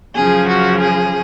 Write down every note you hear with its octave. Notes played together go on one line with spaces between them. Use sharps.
F#2 C#3 F3 G#4
F#4
G#4